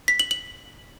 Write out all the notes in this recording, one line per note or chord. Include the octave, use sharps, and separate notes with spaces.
B6
F#7
F#7